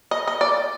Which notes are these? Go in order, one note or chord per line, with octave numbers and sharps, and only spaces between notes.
D#5
D#5
D5